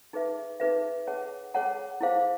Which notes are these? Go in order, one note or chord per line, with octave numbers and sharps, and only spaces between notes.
D#4 G#4 B4 E5
D#4 G#4 B4 E5
G#4 C#5 F#5 A5
G#4 C#5 F#5 A5
E4 G#4 C5 F5